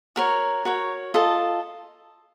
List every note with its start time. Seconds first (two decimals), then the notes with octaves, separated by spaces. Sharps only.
0.16 F#4 A#4 C#5
0.65 F#4 A#4 C#5
1.14 F4 A4 D#5 A5